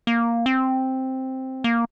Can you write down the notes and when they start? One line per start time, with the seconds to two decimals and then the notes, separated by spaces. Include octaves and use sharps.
0.07 A#3
0.46 C4
1.64 A#3